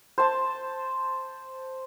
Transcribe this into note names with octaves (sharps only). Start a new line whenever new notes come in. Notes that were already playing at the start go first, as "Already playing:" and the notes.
C5 A5